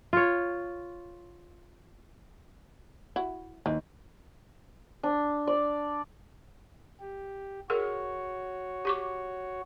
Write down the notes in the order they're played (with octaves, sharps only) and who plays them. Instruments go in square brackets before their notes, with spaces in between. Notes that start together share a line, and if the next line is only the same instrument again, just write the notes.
[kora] F4 C#5
[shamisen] E4 F#4
[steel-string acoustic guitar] D#2 [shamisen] E3
[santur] D4
D5
[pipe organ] G4
[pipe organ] F#4 C#5 [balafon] G#4 A#4
[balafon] G4 C#6 D6